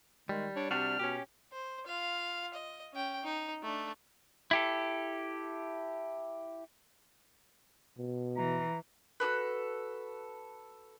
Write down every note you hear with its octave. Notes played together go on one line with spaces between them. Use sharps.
D#3 G3 G#3
D4 C#5
C3 G3 D4 F#4 F6
B2 C#4 G4
C5
F4 F5
D#5
C#4 G5
D#4
A3 D4
E4 G4 A4
B2
E3 A#5
F#4 G4 A4 B4